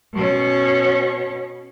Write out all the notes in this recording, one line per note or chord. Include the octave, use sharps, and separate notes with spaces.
B2 C#4